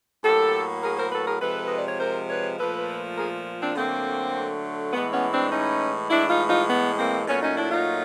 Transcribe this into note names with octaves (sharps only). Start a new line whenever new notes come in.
A2 F#3 A#3 G4 A4
G#4 A#4
A#4 C5
A4 B4
G#4 A#4
C3 F3 G#3 A4 B4
D#5
D5
C#5
A#4 C5
B4 C#5
A#2 F3 A3 A4 B4
G#4 A#4
C4 D4
D3 F#3 A3 A#3 C4
A2 E3 G#3 B3
B3 C#4
C4 D4
C#4 D#4
A2 E3 G#3 D4 E4
D#4 F4
D#4 F4
B3
A#3 C4
A#2 F#3 A3 B3 C#4
C#4 D#4
D4 E4
D#4 F4